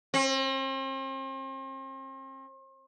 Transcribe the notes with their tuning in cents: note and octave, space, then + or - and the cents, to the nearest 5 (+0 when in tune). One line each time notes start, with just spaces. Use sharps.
C4 +40